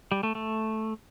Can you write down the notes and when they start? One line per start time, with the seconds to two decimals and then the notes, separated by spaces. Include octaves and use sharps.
0.12 G3
0.23 A3
0.35 A3